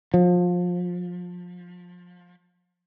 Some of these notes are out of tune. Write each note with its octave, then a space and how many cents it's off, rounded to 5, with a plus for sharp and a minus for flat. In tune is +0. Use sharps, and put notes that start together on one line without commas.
F3 +25